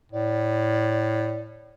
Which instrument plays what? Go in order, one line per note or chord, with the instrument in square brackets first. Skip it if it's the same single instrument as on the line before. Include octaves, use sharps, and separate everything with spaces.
[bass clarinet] A2 [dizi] D5